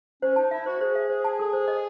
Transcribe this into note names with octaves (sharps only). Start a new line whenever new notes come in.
C#4 C5
D#4 A5
E4 E5
F#4 C5
G#4 C5
E5
C5
A5
A4
C5
D#5